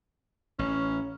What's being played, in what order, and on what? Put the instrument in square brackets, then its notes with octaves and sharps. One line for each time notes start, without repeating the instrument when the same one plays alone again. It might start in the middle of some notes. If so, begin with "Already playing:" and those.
[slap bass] A1 [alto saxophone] C#4